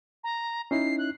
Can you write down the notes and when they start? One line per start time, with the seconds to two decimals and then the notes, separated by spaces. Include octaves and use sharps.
0.24 A#5
0.71 C#4 D#4 E4 C7
0.99 F#6